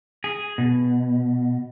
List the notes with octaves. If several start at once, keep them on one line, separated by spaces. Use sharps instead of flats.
G#4
B2